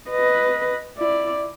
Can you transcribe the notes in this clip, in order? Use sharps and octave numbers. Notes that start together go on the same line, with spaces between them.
B4 D#5
E4 D5